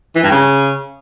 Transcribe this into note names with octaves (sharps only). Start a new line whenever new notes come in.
E3
G2
C#3